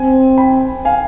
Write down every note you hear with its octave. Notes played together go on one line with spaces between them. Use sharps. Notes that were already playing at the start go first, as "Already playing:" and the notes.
Already playing: C4 G#5
G5 B5
F5 G#5